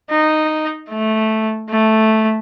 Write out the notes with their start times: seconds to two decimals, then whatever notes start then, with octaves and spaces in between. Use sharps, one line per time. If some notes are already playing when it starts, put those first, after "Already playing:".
0.10 D#4
0.90 A3
1.70 A3